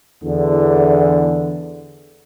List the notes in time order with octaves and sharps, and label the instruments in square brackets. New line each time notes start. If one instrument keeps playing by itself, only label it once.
[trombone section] E2 D3